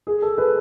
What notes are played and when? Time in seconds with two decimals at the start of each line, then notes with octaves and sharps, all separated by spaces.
0.07 G#4
0.22 A4
0.38 B4